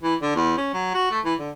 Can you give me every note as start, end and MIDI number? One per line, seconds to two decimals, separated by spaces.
0.03 0.15 52
0.22 0.36 50
0.36 0.54 40
0.57 0.71 61
0.74 0.92 54
0.94 1.11 66
1.11 1.19 57
1.24 1.34 52
1.39 1.51 50